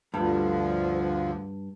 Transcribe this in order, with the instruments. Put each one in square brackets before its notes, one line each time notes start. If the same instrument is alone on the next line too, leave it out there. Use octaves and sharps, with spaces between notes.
[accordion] D2 D3 F3 [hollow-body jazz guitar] G2 G3